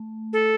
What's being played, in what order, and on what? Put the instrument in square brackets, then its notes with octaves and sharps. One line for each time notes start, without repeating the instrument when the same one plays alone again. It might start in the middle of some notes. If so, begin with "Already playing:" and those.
Already playing: [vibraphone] A3
[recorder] A4